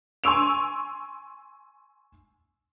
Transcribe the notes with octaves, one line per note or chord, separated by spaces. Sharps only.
G#5 C6 C#6 E6 D7 F7